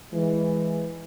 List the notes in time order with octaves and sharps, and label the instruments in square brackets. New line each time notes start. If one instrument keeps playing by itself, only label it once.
[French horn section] E3 G#3